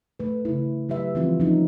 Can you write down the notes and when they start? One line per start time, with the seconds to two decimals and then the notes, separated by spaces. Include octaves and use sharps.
0.20 A3 B4
0.45 C#3 E4
0.89 F#3 G4 B4 E5
1.15 E3 F3 G3 C4 F4
1.40 F3 F#3 C#4 D#4